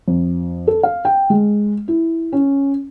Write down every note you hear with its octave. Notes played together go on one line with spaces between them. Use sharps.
F2
A4
F5
G5
G#3
E4
C#4